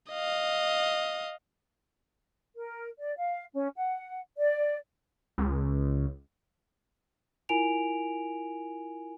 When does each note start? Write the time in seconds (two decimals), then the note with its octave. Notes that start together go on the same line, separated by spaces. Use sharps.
0.11 D#5 F5
2.57 A#4
2.99 D5
3.17 F5
3.54 C#4
3.77 F#5
4.38 D5
5.38 C#2
7.49 E4 F4 A#4 G#5 D7 F7